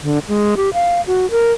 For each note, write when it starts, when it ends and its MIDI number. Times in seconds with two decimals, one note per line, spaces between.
0.01 0.19 50
0.28 0.55 56
0.57 0.70 67
0.74 1.01 77
1.07 1.29 66
1.31 1.52 70